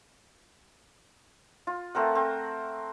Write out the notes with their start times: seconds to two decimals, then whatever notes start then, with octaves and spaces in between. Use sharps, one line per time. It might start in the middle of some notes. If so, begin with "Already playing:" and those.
1.67 F4
1.95 A3 C4 A#4 F#5
2.15 C4